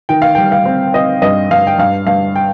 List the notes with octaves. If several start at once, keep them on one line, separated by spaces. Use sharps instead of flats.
D#3 G5
F5
G3 G5
F5
C4
C4 D#5
G2 D#5
G2 F5
G5
G2 F5
G2 F5
G5